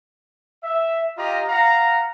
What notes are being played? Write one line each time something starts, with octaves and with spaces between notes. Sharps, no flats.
E5
F4 G4 D#5 A#5
F5 F#5 A#5